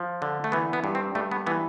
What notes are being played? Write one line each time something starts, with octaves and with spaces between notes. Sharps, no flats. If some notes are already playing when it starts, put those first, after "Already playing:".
Already playing: F3
D3
A3
E3 B3
B3
G2
C4
G2 A3
B3
E3 B3